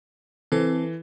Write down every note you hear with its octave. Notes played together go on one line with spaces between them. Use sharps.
E3 C4 A4